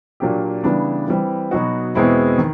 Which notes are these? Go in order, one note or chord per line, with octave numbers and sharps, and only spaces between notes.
A#2 F#3 A#3 D4 G4
C#3 E3 G3 B3 D4
E3 G3 C4
B2 F#3 B3 D#4 F#4
E2 B2 G#3 C4 E4
D#3